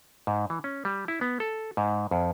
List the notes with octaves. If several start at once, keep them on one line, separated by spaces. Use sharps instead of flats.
G#2
E3
C#4
G3
E4
B3
A4
G#2
F2